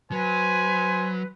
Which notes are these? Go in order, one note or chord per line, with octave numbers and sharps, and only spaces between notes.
F#3 B4 C5 G#5